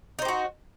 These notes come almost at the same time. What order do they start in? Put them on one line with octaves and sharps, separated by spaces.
D#4 C5 G4 F#4